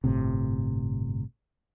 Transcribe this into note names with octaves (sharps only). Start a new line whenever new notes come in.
G1 A2 C3